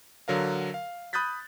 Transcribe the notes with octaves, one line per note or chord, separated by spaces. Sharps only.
D3 F#3 A#4 F5
F5
B5 D#6 F#6 G6 A6 B6